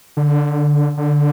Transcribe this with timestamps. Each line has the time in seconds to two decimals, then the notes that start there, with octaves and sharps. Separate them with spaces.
0.17 D3
0.97 D3